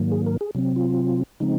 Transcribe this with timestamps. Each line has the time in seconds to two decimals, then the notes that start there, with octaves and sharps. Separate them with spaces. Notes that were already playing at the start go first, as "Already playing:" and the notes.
Already playing: G#2 D#3 F#3 A#3
0.12 G#4
0.26 A#4
0.41 G#4
0.55 C3 F#3 C4
0.76 F4
1.40 C#3 F3 G#3 C4 D#4